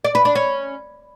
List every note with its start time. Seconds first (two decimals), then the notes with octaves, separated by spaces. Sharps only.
0.05 D5
0.15 B4
0.25 D4
0.35 C#4